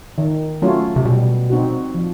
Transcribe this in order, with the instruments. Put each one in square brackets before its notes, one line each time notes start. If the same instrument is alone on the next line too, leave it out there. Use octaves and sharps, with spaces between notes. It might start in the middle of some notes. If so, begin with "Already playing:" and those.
[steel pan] D#3
F#3 A3 C#4 F4
[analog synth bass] C3
[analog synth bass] B2 [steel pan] G3
[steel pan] C4 D#4 F#4
F3